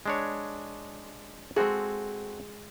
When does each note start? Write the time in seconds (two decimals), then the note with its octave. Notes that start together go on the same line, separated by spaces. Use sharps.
0.06 G#3 D4 C#5
1.56 G#3 C4 F#4 G#4 A4